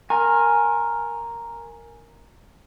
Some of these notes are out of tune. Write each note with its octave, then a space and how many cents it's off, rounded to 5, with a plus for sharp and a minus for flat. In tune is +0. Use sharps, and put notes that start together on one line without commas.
A#4 +0 G#5 +0 C6 +40